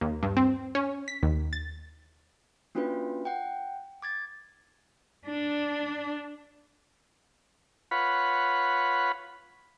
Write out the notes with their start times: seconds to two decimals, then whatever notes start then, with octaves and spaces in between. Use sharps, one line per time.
0.01 D#2
0.23 G2
0.37 C4
0.75 C#4
1.08 B6
1.23 D#2
1.53 A6
2.75 A#3 C#4 D4 F4 F#4 B4
3.25 F#5 G5
4.02 D6 G#6 A6
5.27 D4
7.91 F4 B4 C#5 F#5 B5